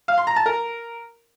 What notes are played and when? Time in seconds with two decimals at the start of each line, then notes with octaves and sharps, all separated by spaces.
0.08 F5
0.18 C6
0.27 A#5
0.36 A5
0.46 A#4